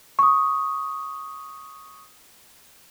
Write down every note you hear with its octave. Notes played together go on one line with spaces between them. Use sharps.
C#6 D#6